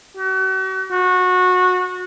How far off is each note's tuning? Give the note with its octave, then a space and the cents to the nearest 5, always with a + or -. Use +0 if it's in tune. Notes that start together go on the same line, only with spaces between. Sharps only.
F#4 +40
F#4 -20